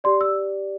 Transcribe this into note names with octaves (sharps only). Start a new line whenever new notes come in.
G4 D5 C6
E6